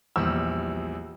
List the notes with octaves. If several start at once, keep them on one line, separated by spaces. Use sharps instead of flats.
A#1 E2 G3 E6